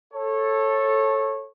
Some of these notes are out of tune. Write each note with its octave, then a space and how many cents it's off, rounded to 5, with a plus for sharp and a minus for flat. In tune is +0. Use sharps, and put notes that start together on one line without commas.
A4 +0 C#5 -20